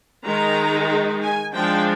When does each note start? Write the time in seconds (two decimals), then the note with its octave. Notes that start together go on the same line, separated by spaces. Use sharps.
0.25 D#3 G#3 D#4 A#5
1.22 G#5
1.54 F3 G#3 D4 G5